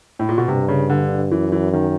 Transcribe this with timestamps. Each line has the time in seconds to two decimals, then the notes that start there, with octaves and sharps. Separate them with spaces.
0.19 A2
0.29 A#2
0.38 B2
0.48 G2 C3
0.69 C#3
0.90 D3
1.31 F#2 E3
1.52 E3
1.73 D#3